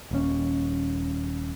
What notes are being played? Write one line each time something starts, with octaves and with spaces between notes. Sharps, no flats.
D#1 D#2 C#4